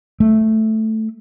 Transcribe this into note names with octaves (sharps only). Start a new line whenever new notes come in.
A3